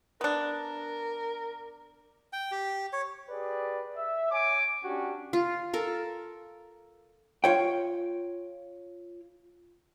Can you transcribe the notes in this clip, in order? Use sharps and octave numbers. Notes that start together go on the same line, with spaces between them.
B3 D4 A#4
G5
G4
C#5
G4 G#4 B4 D5
E5
C#5 G#5 D6
C#4 D4 F#4 G4
F4
A4 A#4
F4 C#5 G5